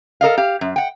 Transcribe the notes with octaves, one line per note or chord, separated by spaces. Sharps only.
A4 A#4 D#5 F5
G4 F5
F#2
F#5 G5